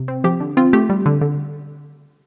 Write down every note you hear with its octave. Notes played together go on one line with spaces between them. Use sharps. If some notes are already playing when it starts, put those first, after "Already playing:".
Already playing: C3
C4
F3 G4
D3
C4 F4
A3 G4
G3
D3
D3